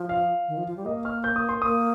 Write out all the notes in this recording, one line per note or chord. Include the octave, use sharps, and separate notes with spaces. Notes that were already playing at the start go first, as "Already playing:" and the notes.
Already playing: F3
F5
D#3
F3
F3
G3
A#3 D#5
F6
G6
D#6
C6
A#3 D#6